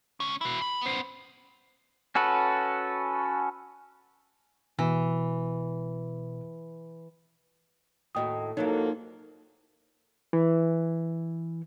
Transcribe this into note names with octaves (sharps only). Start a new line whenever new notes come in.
C#2 C#4
E4 F#4
B5
B3 C5
C#4 F#4 A4 B4
B2 E3
D#2 A2 F#4 D#5 G5 D#6
G#2 F3 F#3 A#3 D#4 E4 A4 C#5
E3